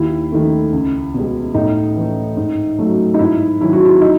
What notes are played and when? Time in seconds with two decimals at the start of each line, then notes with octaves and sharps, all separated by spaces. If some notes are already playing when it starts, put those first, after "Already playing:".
Already playing: D#2 E4
0.32 D#3 A3
0.73 C#2
1.14 B2 G#3
1.54 A2 D#4
1.96 E3 A3
2.37 G#2
2.78 F#3 A3
3.14 D#4
3.19 G#2 E4
3.61 D#3 F#3 E4
3.73 F#4
3.85 E4
4.01 D#4